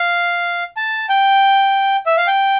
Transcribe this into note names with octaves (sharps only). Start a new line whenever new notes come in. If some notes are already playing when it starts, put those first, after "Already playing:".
Already playing: F5
A5
G5
E5
F5
G5